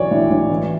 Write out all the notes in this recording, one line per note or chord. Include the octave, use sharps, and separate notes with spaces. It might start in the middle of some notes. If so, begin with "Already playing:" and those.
Already playing: B1 E3 C#5 D5
A2
A2
E3